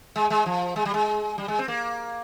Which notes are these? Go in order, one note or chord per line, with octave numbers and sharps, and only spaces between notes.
G#3
G#3
F3
G#3
G3
G#3
G3
G#3
C4
A#3